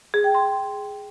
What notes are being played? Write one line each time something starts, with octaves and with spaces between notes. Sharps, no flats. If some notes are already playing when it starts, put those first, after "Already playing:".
G#4
G5
C6